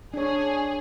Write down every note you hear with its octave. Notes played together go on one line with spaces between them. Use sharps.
D4 G#4 C#5